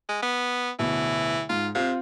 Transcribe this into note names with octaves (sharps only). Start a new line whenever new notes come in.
G#3
B3
D1 B2 E3
G#2 F4
C3 C4 F4 F5